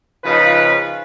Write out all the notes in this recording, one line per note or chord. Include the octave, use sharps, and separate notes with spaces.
C#3 F3 D#4 B4